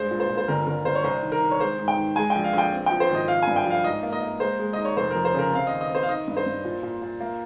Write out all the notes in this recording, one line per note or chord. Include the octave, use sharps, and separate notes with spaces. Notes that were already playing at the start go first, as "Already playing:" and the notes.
Already playing: G2 G#3 C5
A#2
C5
A#2
C5
G1 A#4
G1 A#4
G1 C5
C#5
C2 C5
D#3
A#4
D#3
C#5
G#3 C5
G#2
G5
D#3
G#3 G#5
G5
A#1
F5
A#1 G5
C4
F3 G5
C5
G#1
D#5
F3 F5
G2 G#5
G5
F3 F5
G#2 D#5
A#3
D#5
A#3
G#3 C5
G#3
D#4 D#5
C#5
F1 C5
F2 A#4
C5
C#3 A#4
C4 F5
D#2 D#5
D#5
C4 C5
F5
D#3 D#5
G2
C5
G2
A#2
A#2
A#2
A#3